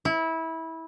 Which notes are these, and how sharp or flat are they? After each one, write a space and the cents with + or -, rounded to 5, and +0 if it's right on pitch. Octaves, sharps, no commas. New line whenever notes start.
E4 -20